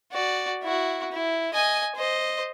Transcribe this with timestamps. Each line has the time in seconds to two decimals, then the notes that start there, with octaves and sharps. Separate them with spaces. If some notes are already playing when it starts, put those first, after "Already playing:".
0.12 F#4 D5
0.63 E4 F#4
1.12 E4
1.54 D#5 G#5
1.96 C5 D#5